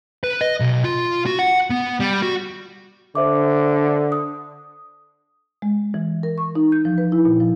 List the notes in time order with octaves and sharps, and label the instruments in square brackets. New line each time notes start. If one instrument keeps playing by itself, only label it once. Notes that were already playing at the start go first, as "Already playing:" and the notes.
[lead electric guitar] B4
D#5
B1
F4
F#4
F#5
B3
G3
F#4
[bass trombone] D3 [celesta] C5 E5 D6
[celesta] D#6
[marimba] G#3
E3
A#4
C#6
D#4
G6
F3
B4
E4
A#2
F3